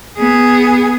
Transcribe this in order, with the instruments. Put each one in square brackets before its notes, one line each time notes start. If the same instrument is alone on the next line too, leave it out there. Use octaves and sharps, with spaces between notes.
[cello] B3 G#4